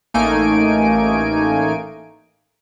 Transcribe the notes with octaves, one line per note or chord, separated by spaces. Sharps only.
A1 A3 A#3 D#4 G#5 D7